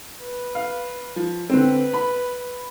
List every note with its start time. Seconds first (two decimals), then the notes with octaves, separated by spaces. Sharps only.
0.21 B4
0.55 F5
1.16 F3
1.50 D3 C4 B4
1.93 B5